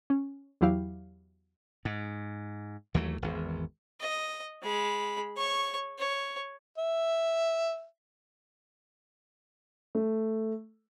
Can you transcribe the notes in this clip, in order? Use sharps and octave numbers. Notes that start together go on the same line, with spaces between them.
C#4
E2 F#3 E4 G4 F5
G#2
D#2 E3 F#3 A3
G#1 E2
D#5
G#3 B5
C#5 C#6
C#5
E5
A3